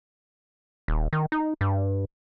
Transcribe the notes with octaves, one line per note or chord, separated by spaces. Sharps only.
D#1
D#3
D#4
G2